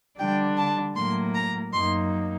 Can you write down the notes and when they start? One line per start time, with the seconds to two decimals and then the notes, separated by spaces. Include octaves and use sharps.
0.19 D3 G3 D4 G5
0.58 A5
0.96 A2 F#3 A#3 C6
1.34 A#5
1.73 F#2 F#3 A#3 D#4 C6